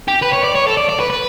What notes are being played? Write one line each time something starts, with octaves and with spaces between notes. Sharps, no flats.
G4
B4
C#5
D5
C#5
A4
D5
D5
B4
B4